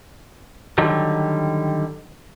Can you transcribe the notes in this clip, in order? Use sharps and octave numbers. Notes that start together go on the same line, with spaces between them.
D3 D#3 F#3 G3